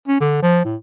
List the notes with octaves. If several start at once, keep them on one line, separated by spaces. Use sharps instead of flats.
C#4
D3
F3
A2